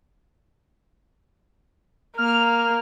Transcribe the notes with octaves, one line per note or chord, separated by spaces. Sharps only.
A#3 F6